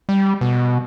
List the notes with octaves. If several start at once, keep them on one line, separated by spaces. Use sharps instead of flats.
G3
B2